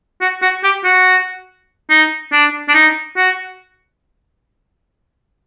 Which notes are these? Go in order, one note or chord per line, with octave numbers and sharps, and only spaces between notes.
F#4
F#4
G4
F#4
D#4
D4
D4
D#4
F#4